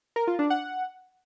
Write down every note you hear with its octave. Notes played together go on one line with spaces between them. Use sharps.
A#4
F4
D4
F#5